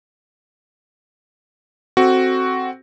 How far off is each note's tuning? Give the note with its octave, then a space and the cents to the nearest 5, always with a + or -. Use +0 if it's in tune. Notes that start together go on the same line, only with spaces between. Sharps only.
C4 +5 F#4 +5 A4 +0